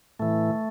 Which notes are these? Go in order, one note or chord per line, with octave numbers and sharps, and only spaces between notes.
A2 E3 A3